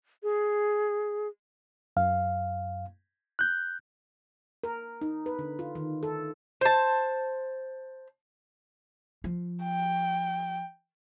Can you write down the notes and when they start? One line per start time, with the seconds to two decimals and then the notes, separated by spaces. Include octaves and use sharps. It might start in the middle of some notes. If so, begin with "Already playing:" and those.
0.23 G#4
1.97 F#2 F5
3.39 F#6 G6
4.64 A#4
5.01 D#4
5.26 B4
5.39 D3
5.59 F4
5.75 D#3
6.03 A4
6.61 C5 A5
9.24 F3
9.64 G5